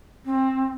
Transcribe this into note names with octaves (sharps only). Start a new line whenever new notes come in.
C4